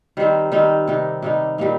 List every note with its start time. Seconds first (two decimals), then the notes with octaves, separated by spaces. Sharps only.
0.17 D#3 G3 C4 D#4
0.52 D#3 G3 C4 D#4
0.88 C3 G3 D#4
1.22 C3 G3 D#4
1.58 A#2 G3 A#3 D#4